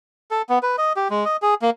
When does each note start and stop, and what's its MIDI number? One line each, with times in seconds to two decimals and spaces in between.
0.31 0.42 69
0.49 0.59 59
0.63 0.76 71
0.78 0.93 75
0.96 1.08 67
1.10 1.25 56
1.25 1.37 75
1.42 1.55 68
1.62 1.70 58